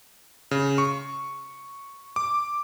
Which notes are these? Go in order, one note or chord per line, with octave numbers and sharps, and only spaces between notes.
C#3
C#6
D6